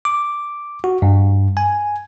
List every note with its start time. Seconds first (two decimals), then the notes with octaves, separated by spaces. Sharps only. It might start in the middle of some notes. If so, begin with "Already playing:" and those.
0.05 D6
0.84 F#4
1.02 G2
1.57 G#5